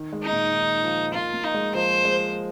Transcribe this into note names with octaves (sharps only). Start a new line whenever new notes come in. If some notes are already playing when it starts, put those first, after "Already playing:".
Already playing: D#3
G#3
D#4
A#2
D#3
F3
A#3 F4
A#3
D#4
G#3
F3 C5
G#3